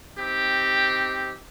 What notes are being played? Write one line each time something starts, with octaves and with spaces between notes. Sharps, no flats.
C4 D#4 G4